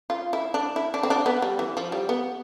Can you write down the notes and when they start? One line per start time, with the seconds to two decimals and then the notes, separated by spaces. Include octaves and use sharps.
0.10 F4
0.33 E4
0.54 D4
0.76 E4
0.94 D4
1.03 C4
1.10 D4
1.26 B3
1.42 G3
1.59 E3
1.77 F3
1.92 G3
2.09 B3